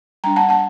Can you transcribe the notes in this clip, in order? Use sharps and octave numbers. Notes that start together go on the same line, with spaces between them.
G3 D4 G5 A#5
F#5 A5
F#5 A5